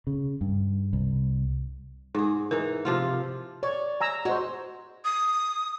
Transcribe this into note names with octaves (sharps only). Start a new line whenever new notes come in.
C#3
G2
C2
G#2 D#4 G#4
E3 D#4 A#4
C3 F3 F4
C#5 D5
G#5 A#5 E6
G#3 F#4 C5
D#6